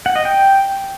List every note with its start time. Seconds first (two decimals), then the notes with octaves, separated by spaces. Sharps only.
0.06 F#5
0.16 D#5
0.25 G5